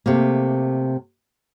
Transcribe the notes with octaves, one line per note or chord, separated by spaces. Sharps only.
C3 A3 A#3